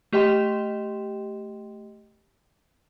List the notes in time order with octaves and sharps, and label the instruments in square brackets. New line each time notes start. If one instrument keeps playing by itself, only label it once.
[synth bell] A3 G4 D#5 G5 C6 E7